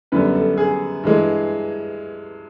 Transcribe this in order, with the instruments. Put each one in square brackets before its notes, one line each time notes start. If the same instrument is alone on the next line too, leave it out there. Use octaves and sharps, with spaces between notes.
[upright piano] F#2 D3 G3 B3 B4
A4
G#4
G2 E3 G#3